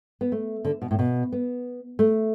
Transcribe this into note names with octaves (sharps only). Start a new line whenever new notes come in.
B3
A3
D3
B2
A2
B2
B3
A3